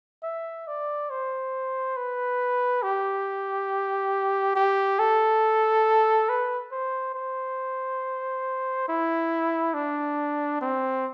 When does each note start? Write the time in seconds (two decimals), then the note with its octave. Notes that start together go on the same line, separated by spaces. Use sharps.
0.23 E5
0.67 D5
1.10 C5
1.97 B4
2.83 G4
4.56 G4
4.99 A4
6.29 B4
6.72 C5
7.15 C5
8.88 E4
9.74 D4
10.61 C4